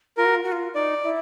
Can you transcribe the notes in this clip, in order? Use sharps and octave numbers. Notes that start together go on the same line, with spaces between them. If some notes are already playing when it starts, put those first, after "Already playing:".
F4 A#4
F#4
F4
F#4
F4
D#4 D5
E4